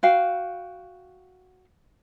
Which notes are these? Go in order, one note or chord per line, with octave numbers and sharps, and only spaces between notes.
F#4 F5 G5